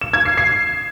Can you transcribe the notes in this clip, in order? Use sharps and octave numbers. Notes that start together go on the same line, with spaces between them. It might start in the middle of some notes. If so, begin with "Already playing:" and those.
E7
G#6
C7
C7